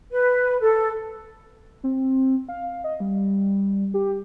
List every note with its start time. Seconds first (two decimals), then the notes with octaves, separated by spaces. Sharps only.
0.11 B4
0.61 A4
1.84 C4
2.49 F5
2.84 D#5
3.00 G3
3.94 G4